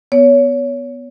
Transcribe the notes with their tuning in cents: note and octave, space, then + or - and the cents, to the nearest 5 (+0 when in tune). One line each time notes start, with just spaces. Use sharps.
B3 +5 C#5 +25